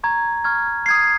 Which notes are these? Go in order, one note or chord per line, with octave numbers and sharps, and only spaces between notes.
A#5 C#6 G#6
C#6 F6 G#6
D#6 G#6 C7